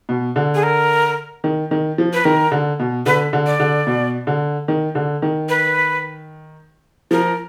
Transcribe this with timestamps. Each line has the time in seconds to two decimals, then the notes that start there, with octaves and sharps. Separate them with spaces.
0.09 B2
0.36 D3
0.55 G#4
0.63 A#4
1.44 D#3
1.71 D#3
1.98 F3
2.13 B4
2.24 D#3 A#4
2.51 D3
2.80 B2
3.06 D3 B4
3.33 D3
3.46 D5
3.60 D3
3.87 B2
4.27 D3
4.68 D#3
4.95 D3
5.22 D#3
5.49 B4
7.11 F3 A#4